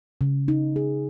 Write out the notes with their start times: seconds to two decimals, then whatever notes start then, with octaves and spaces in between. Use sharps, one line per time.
0.21 C#3
0.48 D#4
0.76 G#4